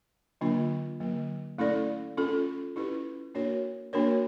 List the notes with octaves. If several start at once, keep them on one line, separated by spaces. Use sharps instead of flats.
D3 F#3 A#3 D4 F4
D3 F#3 A#3
A3 C#4 E4 A4 D5
C#4 F4 A4
C#4 E4 G4 B4
A#3 D4 F#4 A#4 C#5
A#3 D4 F#4 A#4 C#5